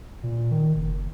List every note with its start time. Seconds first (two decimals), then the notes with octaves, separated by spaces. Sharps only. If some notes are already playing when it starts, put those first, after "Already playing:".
0.23 A#2
0.51 D#3
0.76 F#1